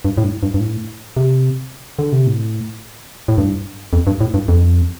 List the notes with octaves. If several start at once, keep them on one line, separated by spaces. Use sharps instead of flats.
G2
A2
G2
G2
G2
A2
C3
D3
C3
A2
A2
G2
F2
G2
A2
G2
F2